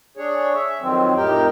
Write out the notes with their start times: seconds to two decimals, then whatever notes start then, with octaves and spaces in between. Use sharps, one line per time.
0.17 D4 G#4 C#5
0.55 E5
0.81 F2 D#3 F#3 C4
1.16 F2 A2 D#4 G4 A#4 G5